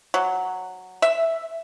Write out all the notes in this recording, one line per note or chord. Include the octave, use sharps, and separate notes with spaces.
F#3
E5